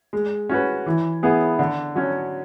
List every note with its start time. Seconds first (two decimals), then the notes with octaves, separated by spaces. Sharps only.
0.13 G#3
0.49 C#4 F#4 B4
0.86 E3
1.23 B3 E4 G#4 B4
1.59 D3
1.95 F#3 C#4 F#4